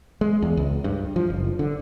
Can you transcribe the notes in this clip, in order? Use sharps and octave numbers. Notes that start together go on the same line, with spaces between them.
G#3
E2
C#2
G2
F3
F#1
D3